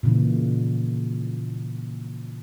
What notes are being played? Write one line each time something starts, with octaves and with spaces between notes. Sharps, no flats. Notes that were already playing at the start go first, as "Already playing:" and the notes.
A#2 C#3 E3